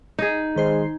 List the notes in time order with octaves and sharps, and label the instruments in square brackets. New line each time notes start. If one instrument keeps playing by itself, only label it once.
[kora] D#4 G#4
[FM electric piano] D#3 C5 C7 [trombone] G#3